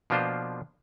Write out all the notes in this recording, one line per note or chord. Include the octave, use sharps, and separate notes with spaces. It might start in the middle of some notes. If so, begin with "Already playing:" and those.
B2 F3 A#3 D4 F4 C5